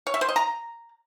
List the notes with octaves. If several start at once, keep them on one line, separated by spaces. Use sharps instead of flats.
C#5
E5
C5
D#5
A#5